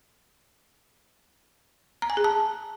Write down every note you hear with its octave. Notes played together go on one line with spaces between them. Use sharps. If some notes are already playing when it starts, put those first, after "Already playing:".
A#5
G#5
G#4
A5